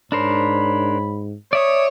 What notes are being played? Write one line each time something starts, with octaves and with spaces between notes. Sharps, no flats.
G#2 D4 A#4 C5 C#5 B5
C#5 D5 E5 D#6